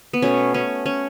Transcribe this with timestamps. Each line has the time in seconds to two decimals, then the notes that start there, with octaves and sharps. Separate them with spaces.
0.13 B3
0.22 B2 A3 C#4
0.54 C#4
0.86 C#4